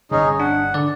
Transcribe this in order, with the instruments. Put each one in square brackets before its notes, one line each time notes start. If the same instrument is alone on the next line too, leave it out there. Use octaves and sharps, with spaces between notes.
[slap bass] G1 C3 [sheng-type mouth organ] C#4 D#4 G#4
[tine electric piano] D4 [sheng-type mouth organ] F#5
[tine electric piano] D3 D5